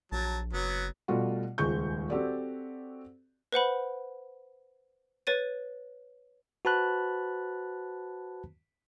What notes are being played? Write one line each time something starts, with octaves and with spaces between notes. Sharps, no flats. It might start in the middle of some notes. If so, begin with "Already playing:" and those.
A#1 F#3 A5
F#1 F#3 B3
B2 G3 A3 F4 F#4
D#1 C#2 G#3 C#6 G6
C4 F#4 G4 A4 D5
B4 C5 F#5 B5
B4 C#5 A6 D#7
F#4 B4 C5 A5 B5 F#6